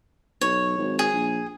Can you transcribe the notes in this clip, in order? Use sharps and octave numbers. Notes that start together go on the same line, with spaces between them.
B1 C#5
G#1
G#4
A#1